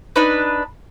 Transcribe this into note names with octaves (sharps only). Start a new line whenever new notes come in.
D4 D#4 B4